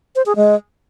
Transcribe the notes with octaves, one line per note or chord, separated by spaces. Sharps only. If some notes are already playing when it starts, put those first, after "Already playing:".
C5
G#4
G#3